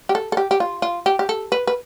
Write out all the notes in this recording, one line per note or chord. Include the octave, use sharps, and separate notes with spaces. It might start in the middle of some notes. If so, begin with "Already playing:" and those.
G4
A4
A4
G4
G4
F4
F4
G4
G4
A4
B4
B4